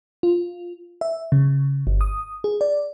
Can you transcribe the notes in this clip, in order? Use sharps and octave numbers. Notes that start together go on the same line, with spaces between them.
F4
E5
C#3
G1
D#6
G#4
D5